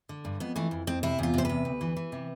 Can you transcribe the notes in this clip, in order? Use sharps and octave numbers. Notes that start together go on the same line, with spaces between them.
D3
G2
F2 B3
E3 A3
F2
F2 C4
C3 E4
E2 F4
C3 C5
E2 B4
D2
E3
E3
C3